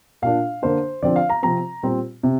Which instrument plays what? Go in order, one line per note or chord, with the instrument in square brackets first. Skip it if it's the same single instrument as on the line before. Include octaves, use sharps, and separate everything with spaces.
[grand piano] A#2 A#3 D4 F5
D3 A#3 D4 C5
D3 F3 C4 D5
F5
A#5
C3 F3 C4 A#5
A#2 G3 C4
C3